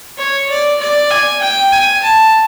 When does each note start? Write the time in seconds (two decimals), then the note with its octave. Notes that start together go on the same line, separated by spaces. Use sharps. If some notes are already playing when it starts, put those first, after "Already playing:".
0.18 C#5
0.49 D5
0.80 D5
1.10 G#5
1.41 G5
1.72 G#5
2.03 A5